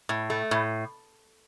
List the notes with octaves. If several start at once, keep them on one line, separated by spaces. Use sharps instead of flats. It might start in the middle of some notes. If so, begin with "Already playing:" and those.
A2
A3
A2